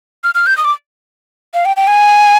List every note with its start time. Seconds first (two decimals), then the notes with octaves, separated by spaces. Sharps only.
0.24 F6
0.35 F6
0.46 G6
0.58 D#6
0.65 D6
1.54 F5
1.65 G5
1.76 G5
1.87 G#5